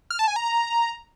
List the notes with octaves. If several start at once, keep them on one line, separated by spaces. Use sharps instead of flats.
F6
A5
G#5
A#5